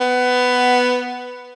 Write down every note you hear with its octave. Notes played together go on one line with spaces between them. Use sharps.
B3